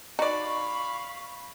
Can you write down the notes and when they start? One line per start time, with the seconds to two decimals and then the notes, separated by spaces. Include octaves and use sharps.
0.19 D#4 F#4 D5 F5 B5 C#6